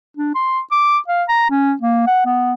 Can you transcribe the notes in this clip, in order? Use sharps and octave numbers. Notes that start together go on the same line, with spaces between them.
D4
C6
D6
F5
A#5
C#4
A#3
F#5
B3